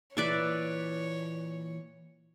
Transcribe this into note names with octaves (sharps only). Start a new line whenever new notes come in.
A#2 E3 B4 C#5 D5 E5